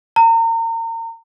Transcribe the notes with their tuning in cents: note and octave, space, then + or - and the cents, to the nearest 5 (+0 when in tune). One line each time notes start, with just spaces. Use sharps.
A#5 -35